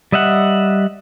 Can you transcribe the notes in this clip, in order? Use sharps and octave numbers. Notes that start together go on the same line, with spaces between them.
G3 D#5 E5 F#5